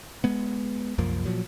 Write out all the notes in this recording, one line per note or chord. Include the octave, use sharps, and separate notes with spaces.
G#3 B3
C2 F#2 F3 A#3
A#2 F3 F#3